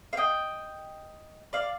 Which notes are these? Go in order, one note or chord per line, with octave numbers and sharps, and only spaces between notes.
F5
D#5 G5
D5 F5